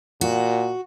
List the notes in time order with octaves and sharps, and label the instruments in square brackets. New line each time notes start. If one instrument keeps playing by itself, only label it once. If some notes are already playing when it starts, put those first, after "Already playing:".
[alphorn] A#2 [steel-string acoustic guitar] F#4